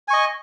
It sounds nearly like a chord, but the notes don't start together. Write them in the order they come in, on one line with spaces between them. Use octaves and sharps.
G#5 C#6 D#5